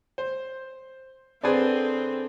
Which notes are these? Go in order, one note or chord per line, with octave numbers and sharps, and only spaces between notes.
C5
D3 C4 G#4 B4 C5 D5 A5